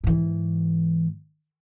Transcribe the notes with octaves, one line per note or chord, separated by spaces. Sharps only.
G#2 E3